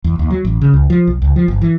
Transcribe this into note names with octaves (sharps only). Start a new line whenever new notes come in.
E2
D#2
F#3
A1
C#3
C#2
F3
B1
C#2
F3
G1
E3